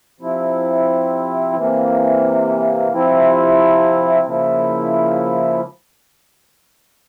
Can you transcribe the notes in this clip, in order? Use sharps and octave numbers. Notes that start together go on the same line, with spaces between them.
C3 F3 C4 E4
C3 E3 A#3
C3 F3 C4 E4
C#3 F3 A#3 E4